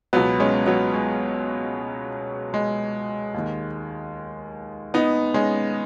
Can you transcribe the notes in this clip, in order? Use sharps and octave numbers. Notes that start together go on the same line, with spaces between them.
C#2 B2 F#3 B3
G#3 C#4
F#3 B3
G#3
G#3
D#2 D#3
B3 D#4
G#3 C#4